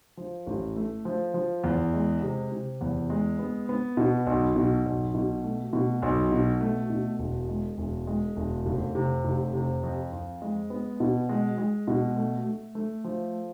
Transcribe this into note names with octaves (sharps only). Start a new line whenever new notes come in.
F3
A1
A3
F3
F3
E2
G#3
C3
C3
E2
G#3
B3
B3
B2
B1
B2
B1
B2
A3
B2
B1
B2
A3
B2
E1
G#3
E1
G#3
E1
F1
C3
F1
C3
F2
F2
G#3
B3
B2
G#3
G#3
B2
A3
A3
A3
F3